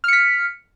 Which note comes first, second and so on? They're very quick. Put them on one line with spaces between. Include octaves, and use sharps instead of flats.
F6 C#7 B6